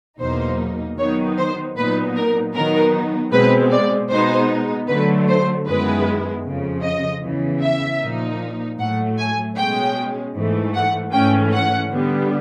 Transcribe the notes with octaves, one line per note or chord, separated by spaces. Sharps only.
E2 B2 F#3 A#3 D#4 C5
D#3 F#3 B3 D#4 C#5
C5
A#2 F#3 B3 D#4 B4
A#4
D#3 F#3 B3 D#4 A#4
B2 G#3 C4 B4
D5
B2 G#3 B3 D#4 C5
D3 F#3 A3 B4
C5
F#2 D#3 G#3 B3 E4 B4
F2 C#3 F3
D#5
E2 C#3 E3
E5
A#2 F3 A#3 D#4
A2 F#3 A3 F#5
G#5
B2 G#3 C#4 G5
G#2 E3 A3
F#5
G#2 E3 A3 C#4 G5
F#5
D3 G3 B3